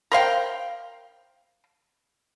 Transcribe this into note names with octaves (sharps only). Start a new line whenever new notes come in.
A#4 C5 F5 G5